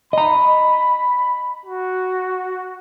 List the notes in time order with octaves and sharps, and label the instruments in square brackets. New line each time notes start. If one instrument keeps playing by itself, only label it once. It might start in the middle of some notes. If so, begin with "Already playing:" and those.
[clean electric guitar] D#5 A#5 [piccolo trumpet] B5
[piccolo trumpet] F#4